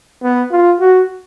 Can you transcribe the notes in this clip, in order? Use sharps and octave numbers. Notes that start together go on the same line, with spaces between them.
B3
F4
F#4